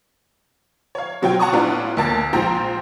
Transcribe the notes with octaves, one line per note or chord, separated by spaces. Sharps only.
C#5 F5
B2 F#3 F4 C#5 G5
F#5 A5 A#5 C#6 D#6
A2 B3 C#4 D4 F4
D2 A#3 A5 A6
A#1 F3 G#3 C5 G5 A#5